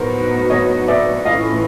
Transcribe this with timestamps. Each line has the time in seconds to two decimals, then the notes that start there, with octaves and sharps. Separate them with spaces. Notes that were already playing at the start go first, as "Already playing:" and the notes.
Already playing: A2 F#3 B3 D#4 F#4 A#4 C5
0.50 C#5 D#5
0.88 D5 E5
1.25 A2 E3 A3 C#4 F4 D#5 F5